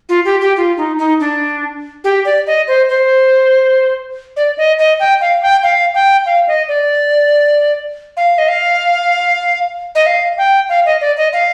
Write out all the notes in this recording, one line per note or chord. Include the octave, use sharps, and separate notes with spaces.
F4
G4
G4
F4
D#4
D#4
D4
G4
D5
D#5
C5
C5
D5
D#5
D#5
G5
F5
G5
F5
G5
F5
D#5
D5
F5
D#5
F5
D#5
F5
G5
F5
D#5
D5
D#5
F5